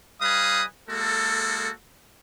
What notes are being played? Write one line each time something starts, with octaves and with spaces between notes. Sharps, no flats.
G3 B4 D#5 F5 G#5 D#6
G#3 A#3 F#4 A4